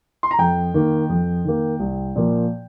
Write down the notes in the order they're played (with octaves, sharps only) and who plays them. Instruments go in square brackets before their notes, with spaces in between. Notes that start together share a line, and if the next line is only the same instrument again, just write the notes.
[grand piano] C6
A#5
F2 G5
D#3 A#3
F2
D#3 A#3
C2
A#2 F3 A#3